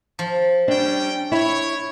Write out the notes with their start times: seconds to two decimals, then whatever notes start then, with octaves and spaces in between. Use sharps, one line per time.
0.19 F3
0.68 G3 C#4 D4 G5
1.32 E4 C#5